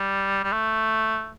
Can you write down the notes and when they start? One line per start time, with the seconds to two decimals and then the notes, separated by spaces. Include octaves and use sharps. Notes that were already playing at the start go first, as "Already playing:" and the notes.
Already playing: G3
0.43 G3
0.52 A3